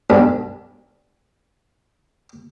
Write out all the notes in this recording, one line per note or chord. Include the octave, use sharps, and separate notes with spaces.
B1 G2